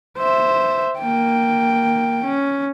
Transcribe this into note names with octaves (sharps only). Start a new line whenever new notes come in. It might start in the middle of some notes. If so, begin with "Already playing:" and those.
C5 E5
A#3 G5
C#4